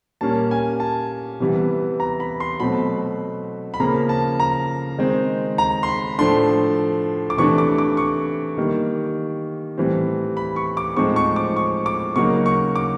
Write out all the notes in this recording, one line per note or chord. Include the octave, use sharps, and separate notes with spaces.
A#2 G3 A#3 C#4 A5
G#5
A5
C3 E3 G3 B3
A#5
B5
C6
B2 F#3 A3 C4 B5
B5
C#3 F3 A#3 A#5
A5
A#5
D#3 G#3 C4 D#4
A#5
C6
B5
A2 F3 A3 D4 C6
D6
C3 E3 A3 D4 C#6
D6
D6
C#6
D#3 G3 A#3
A2 E3 G3 C4
B5
C#6
D6
A2 F3 G#3 C4 D#4 C#6
C#6
D6
C#6
D6
C#3 F#3 A#3 D#4 C#6
C#6
D6